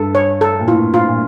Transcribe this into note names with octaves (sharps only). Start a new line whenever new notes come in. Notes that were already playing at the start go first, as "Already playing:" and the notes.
Already playing: G2 A4
C#5
A4
A#2
A2 F4
F4
A#2